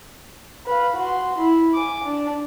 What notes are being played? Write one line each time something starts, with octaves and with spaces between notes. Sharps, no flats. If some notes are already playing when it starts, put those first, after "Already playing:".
B4 F5
F#4 C6
E4
G#5 D6
D4